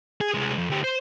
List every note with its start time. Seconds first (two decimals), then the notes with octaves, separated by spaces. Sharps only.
0.21 G#4
0.34 C2 G#3
0.58 F2
0.70 D2 G4
0.84 C5